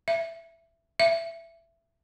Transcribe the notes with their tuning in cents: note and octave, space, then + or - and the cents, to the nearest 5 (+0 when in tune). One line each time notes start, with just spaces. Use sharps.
E5 +15
E5 +20